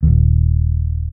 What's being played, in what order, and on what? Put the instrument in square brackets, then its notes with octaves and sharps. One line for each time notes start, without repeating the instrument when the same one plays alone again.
[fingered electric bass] D#1 D#2